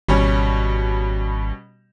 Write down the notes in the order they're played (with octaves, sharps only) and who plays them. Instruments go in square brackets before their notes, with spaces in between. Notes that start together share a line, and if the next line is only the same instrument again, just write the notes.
[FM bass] G#1 [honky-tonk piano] B2 G3 C#4